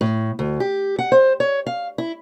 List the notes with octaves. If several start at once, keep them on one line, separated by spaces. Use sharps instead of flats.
A2
D2
G4
F#5
C5
C#5
F5
E4